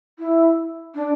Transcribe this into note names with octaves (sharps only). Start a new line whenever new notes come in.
E4
D4